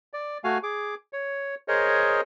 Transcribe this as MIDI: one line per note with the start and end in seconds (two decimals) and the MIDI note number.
0.13 0.38 74
0.44 0.58 57
0.44 0.58 66
0.44 0.58 77
0.44 0.58 80
0.63 0.95 68
0.63 0.95 86
1.13 1.55 73
1.68 2.21 68
1.68 2.21 70
1.68 2.21 72
1.68 2.21 73
1.68 2.21 75